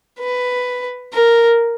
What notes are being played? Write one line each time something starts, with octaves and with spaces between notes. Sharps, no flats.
B4
A#4